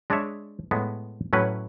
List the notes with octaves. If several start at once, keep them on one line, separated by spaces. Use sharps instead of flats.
G#3 D4 G#4 C#5 E5
A2 G#3 B3
A2 F#3 C#4 E4 B4